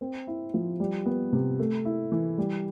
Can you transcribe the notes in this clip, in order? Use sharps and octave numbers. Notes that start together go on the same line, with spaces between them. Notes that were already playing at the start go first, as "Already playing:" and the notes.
C4
E4
F3
G3
B3
C3
A3
E4
E3
G3